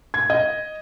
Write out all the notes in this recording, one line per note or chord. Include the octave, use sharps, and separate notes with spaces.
G#6
D#5